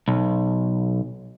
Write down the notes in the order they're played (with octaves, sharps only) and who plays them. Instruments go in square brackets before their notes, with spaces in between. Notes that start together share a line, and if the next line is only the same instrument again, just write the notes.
[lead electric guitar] B1